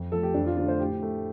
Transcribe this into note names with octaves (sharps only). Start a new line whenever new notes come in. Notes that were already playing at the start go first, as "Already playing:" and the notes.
Already playing: F2
F3 A3 A4
G4
F2 D4
F4
D3 F3 A3 F4
C5
A2 G4
A3